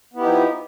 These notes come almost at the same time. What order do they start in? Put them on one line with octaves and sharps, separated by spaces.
B3 E4 G4 D#4 F3